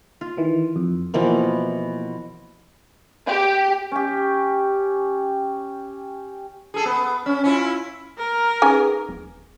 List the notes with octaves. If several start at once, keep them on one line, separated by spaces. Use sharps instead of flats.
F4
D#3 E3
F2
B2 E3 F3 A#3
G4
C#4 G4
G#4 A4
B3
C#4
C#4 E4 F4
A#4
C#4 D#4 G#4 B4 G#5
D#1